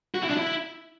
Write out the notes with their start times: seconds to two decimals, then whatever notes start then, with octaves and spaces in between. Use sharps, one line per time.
0.15 F#4
0.23 E4
0.30 D4
0.37 E4